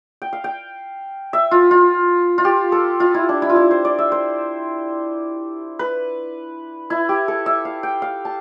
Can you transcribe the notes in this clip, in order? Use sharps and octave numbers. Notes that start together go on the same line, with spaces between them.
G5
F5
G5
E5
F4
F4
F4
G4
A4
F4
E4
D4
E4
F4
E4
C5
D5
E5
C5
B4
E4
G4
A4
E5
F5
G5
F5
A5